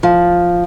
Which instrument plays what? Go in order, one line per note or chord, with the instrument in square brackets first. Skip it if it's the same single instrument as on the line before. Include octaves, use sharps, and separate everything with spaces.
[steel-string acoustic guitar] F3